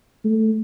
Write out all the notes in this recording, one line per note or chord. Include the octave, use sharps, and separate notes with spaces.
A3